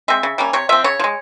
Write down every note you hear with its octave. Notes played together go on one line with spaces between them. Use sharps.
G#3 C4 E5
C#3
G3 A#3 C#4
C3 C#5
F3 C4 E5
C#3 C#5
F3
G#3